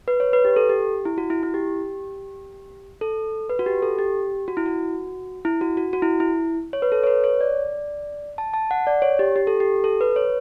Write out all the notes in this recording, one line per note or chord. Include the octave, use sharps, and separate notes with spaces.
B4
C#5
B4
G4
A4
G4
E4
F#4
E4
E4
G4
A4
B4
F#4
G4
A4
G4
F#4
E4
F#4
E4
F#4
F#4
F#4
E4
E4
C#5
B4
A4
C#5
B4
C#5
D5
A5
A5
F#5
D5
C#5
G4
G4
A4
G4
A4
B4
C#5